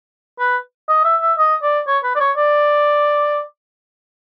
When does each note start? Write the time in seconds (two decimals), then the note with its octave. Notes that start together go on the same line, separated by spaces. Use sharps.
0.39 B4
0.89 D#5
1.05 E5
1.22 E5
1.39 D#5
1.63 D5
1.87 C#5
2.04 B4
2.15 D5
2.20 C#5
2.37 D5